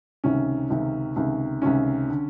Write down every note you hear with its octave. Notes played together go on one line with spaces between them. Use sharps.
C#2 C3 D#3 C#4
C#2 C3 D#3
C#2 C3 D#3
C#2 C3 D#3 C#4
D3